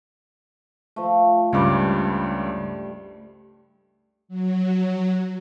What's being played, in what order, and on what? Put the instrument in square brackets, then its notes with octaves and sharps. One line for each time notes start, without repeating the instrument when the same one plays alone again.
[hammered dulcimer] F3 A3
[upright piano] C#2 G2 D6 [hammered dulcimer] G3
[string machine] F#3